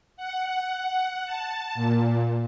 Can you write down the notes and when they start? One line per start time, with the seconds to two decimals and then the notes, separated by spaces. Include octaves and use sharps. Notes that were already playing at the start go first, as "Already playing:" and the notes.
0.17 F#5
1.26 A5
1.75 A#2